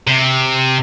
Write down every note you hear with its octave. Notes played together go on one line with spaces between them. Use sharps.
C3